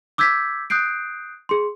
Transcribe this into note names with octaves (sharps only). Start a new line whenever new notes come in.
D6 E6 G6 G#6 B6
D#6 F#6 G6 C7 D7
G#4 C6